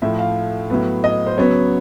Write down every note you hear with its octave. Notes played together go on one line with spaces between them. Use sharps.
A2 F3 A3 E5
F5
A2 F#3 B3
D#5
C5
C#3 F#3 B3 C#5